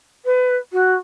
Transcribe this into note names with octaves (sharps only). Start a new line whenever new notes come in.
B4
F#4